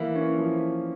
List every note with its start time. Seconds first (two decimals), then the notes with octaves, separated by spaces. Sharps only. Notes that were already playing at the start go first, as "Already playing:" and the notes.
Already playing: E3 A#3
0.15 C#4
0.38 F3